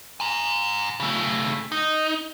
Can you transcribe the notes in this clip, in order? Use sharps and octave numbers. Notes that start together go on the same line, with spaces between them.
G#5 A#5
C#3 A3
D#4